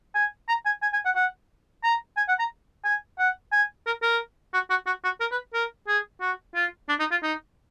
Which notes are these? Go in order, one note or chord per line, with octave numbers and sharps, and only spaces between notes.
G#5
A#5
G#5
G#5
G#5
F#5
F#5
A#5
G#5
F#5
A#5
G#5
F#5
G#5
A#4
A#4
F#4
F#4
F#4
F#4
A#4
B4
A#4
G#4
F#4
F4
D4
D#4
F4
D#4